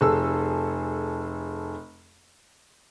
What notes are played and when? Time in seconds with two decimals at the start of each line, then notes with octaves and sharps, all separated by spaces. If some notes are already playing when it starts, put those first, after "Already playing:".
0.01 F1 G#4 A4 E6